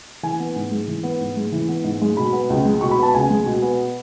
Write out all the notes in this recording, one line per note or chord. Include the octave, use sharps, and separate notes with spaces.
E3 G#5
B3
G#2
G#3
E3
B3
G#2
G#3
E3
B3
G#2
G#3
B2 B5
B3
C#2
G#3
B2 C#6
B5
B3 A5
C#2 G#5
G#3
B2
B3